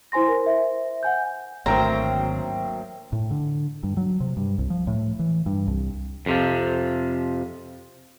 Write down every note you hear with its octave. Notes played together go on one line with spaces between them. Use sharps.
E4 C5 G#5 C6 A#6
A#4 C5
C5 E5
F#5 G#5 G6
G#1 D2 F#3 A#3 C4 G5 A#5
A2
D3
G2
F#3
C3
G2
C2
F3
A2
E3
G2
C2
F2 C3 F3